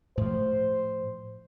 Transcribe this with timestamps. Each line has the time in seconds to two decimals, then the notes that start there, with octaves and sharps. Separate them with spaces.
0.17 A2 F3 C5